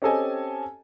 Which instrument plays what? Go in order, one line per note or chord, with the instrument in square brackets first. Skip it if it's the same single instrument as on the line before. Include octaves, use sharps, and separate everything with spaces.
[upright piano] C4 C#4 G4 A4 D#5 G#5